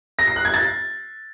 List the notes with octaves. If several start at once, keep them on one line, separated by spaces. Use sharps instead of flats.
A#6
C7
F#6
G#6
A6